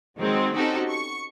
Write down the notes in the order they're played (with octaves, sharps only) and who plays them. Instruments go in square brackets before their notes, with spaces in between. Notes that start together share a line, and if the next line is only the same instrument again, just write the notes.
[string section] D#3 F#3 G#3 C4
C4 C#4 D#4 F#4 G4 A4
C#6